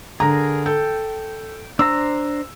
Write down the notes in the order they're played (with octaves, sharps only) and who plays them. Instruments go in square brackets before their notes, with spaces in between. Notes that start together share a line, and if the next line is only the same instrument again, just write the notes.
[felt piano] D3 A#5 [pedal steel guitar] G#4 A#4
[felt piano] A4 [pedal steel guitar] G5
[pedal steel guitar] D4 C5 A#5 [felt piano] E6